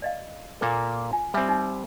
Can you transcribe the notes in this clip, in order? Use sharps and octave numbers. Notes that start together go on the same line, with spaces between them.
D5 D#5 F5
A#2 A#3 A4
F4 G#5
G3 C4 G4 E5 G#5
D#4